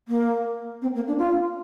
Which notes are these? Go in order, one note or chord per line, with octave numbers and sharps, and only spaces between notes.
A#3
C4
A#3
D4
F4